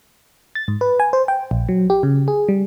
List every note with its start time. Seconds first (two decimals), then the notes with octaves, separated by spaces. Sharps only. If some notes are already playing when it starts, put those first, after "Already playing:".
0.55 A6
0.68 G#2
0.81 B4
1.00 G#5
1.13 C5
1.28 G5
1.51 A#1
1.69 F#3
1.90 G4
2.03 C#3
2.28 G#4
2.49 G3